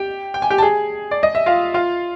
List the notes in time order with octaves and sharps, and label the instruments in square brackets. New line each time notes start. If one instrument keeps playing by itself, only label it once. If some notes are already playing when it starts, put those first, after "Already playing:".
Already playing: [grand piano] G4 G5
G5
G#5
G4 G5
A5
G#4 G#5
D5
D#5
E5
F4 F5
F4 F5